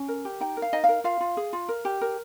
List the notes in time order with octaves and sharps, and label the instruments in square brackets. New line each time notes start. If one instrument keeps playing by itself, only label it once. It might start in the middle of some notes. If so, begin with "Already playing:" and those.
Already playing: [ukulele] C#4
A#4
G4
D#4 G5
A#4
F5
D#4 D#5
F5
A#4
F4 F5
F4
G#4
F4
A#4
G4
A#4